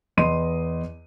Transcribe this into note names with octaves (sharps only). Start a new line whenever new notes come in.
E2 B4 D#5 C6 D#7